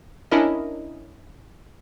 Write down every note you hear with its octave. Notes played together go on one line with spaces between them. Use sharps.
C#4 D4 E4 A#4 D#5